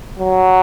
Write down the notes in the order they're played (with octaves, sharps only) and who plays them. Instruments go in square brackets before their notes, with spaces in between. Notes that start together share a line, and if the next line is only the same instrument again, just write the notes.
[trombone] F#3